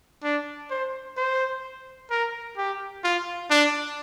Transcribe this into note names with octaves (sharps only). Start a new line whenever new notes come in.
D4
C5
C5
A#4
G4
F4
D4